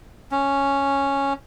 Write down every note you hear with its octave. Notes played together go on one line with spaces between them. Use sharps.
C#4